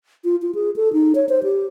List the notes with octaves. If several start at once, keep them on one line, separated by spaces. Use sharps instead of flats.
F4
F4
G#4
A4
D#4
C#5
C5
G4